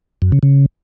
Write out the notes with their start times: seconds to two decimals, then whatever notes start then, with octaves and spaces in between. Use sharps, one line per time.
0.22 F#2
0.32 C#3
0.43 C#3